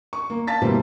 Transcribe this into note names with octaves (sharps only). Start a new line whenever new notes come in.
C#6
A#3
F5 A5 A6 B6
B2 E3 G3 A3 A#3 C4